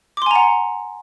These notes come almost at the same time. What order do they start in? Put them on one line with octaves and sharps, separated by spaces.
D6 C6 G#5 A#5 F#5